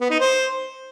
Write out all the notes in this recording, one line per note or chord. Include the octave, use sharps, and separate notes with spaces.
B3
D#4
C5